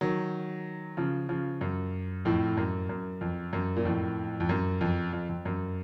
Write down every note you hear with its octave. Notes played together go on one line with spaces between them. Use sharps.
D#3 F#3
C#3 F3
C#3 F3
F#2
F2 A2
F#2
F#2
F2
F#2
A#2
F2 A2
F2
F#2
F2
F2
F2
F#2